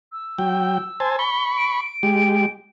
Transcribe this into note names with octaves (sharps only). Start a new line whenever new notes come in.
E6
F#3 G5
C5 G#5 A5
B5 C#6 G7
D7
G#3 G4